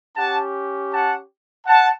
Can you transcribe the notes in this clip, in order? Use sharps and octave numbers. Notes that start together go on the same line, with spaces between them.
C#4 G4 F#5 A5
F#5 A5
F#5 A5